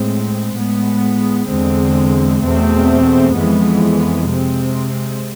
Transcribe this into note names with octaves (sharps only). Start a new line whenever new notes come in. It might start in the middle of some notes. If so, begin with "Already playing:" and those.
Already playing: A2 G#3 C4
A2 G#3 B3
E2 D3 G#3 C4
E2 B2 A3 C4
F2 E3 G#3 B3
C3 G#3 C4